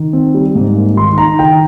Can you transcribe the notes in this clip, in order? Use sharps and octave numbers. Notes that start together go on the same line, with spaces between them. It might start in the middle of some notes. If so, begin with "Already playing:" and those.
Already playing: D#3
C4
G3
G#2
A#3
D#3 C6
D#4 A#5
D#3 G5